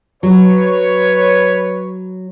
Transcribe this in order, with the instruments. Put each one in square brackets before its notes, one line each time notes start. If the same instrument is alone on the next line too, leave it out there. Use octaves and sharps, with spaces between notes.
[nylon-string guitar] F#3 [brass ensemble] B4 C#5